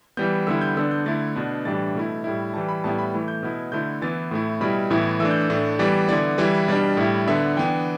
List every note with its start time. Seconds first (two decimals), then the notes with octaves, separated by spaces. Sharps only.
0.17 E3 G3 B3 G6
0.47 D3 G3 B3 E4 E6
0.62 G6
0.76 D3 B3 D4 E6
0.91 G6
1.06 D3 A3 E4 A6
1.36 B2 B3 D4
1.65 A2 E3 G3 D4 A6
1.95 B2 A3 E4
2.24 A2 G3 E4
2.54 E3 G3 E4 A5
2.69 B5
2.84 A2 G3 B3 E4 A5
2.99 B5
3.14 E3 A3 E4
3.28 G6
3.43 B2 B3 E4
3.72 D3 A3 E4 G6
4.02 E3 B3 E4 A6
4.31 A2 A3 E4
4.61 B2 G3 E4 B5
4.91 A2 E3 B3 E4
5.20 E3 A3 D4 E6
5.31 G6
5.41 E6
5.50 A2 A3 D4
5.79 E3 G3 B3 D5
6.09 D3 B3 E4 D5
6.38 E3 G3 E4 B4
6.68 B2 G3 D4 D5
6.97 A2 G3 E4
7.27 D3 B3 D4 E5
7.57 E3 B3 D4 G5